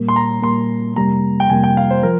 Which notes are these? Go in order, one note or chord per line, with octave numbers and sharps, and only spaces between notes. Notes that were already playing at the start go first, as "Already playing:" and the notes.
Already playing: A#2 G3 A#3
C6
A#5
A#2 G3 A#3 C6
F2 C3 G3 A#3 A#5
G5
F2 C3 G3 A#3 G#5
G5
F5
C5
F3 A#4